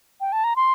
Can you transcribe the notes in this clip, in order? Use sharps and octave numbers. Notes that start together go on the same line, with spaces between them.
G5
A5
A#5
C6